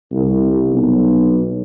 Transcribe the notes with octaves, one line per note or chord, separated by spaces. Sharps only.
C2
B1